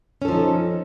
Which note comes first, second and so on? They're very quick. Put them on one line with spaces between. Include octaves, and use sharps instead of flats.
C#4 A4 F3 D#4